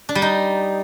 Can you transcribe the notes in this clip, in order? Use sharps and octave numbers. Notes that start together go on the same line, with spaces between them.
D4
G3
D#4